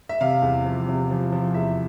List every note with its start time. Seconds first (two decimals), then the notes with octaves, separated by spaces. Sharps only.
0.09 E5
0.21 C3 F5
0.42 E2
0.65 F3
0.88 C3
1.11 F3
1.32 F3
1.54 E2 E5